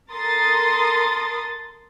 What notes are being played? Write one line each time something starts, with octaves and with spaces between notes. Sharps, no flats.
A4 A#4 C6 D#6 A6